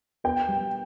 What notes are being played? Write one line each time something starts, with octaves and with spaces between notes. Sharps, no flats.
B3 G5
G3